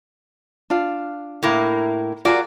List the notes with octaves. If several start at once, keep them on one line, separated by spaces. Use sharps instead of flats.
D4 F4 F5
A2 A#3 E4
F4 F#4 G#4 A#4 D5